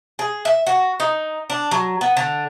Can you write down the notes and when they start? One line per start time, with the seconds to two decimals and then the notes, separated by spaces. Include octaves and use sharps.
0.19 G#4
0.45 E5
0.67 F#4
1.00 D#4
1.50 D4
1.71 F#3
2.01 B3
2.17 D3